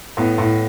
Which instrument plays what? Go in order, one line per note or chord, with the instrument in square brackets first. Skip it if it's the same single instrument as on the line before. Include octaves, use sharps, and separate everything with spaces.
[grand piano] A2 B3
A2